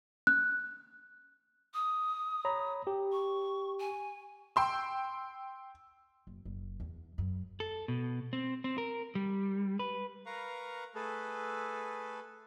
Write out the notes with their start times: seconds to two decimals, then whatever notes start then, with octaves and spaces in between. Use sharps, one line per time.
0.27 F#6
1.74 D#6
2.45 C#5 A#5 B5
2.87 G4
3.12 C#6
3.80 G#5
4.56 G5 C6 E6
6.27 F#1
6.45 F#1
6.80 E2
7.18 F#2
7.60 A4
7.88 B2
8.33 C4
8.64 C4
8.78 A#4
9.15 G3
9.79 B4
10.26 A#4 B4 F5 A#5 C#6
10.95 A3 G#4 A4 B4